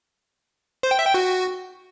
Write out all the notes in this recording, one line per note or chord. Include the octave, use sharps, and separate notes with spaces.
C5
G5
E5
G5
F#4